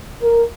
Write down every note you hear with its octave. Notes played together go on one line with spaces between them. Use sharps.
A#4